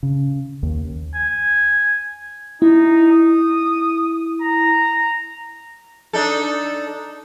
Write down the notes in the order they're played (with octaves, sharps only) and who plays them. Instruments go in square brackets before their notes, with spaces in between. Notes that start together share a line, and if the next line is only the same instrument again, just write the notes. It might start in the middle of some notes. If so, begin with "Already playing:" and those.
[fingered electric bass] C#3
D#2
[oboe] G#5
[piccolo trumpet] D#4 [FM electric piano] E4
[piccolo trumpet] D#6
A#5
[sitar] D4 D#4 A4